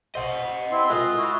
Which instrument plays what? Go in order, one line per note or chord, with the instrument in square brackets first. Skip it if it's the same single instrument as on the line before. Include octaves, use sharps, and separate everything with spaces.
[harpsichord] C5 C6 C#6 [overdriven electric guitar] D#5 F#5
[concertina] C4 E4 C6
[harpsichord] G#3 A#4 D#5 [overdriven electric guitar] F4 [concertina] E6 F#6
[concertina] E4 F#4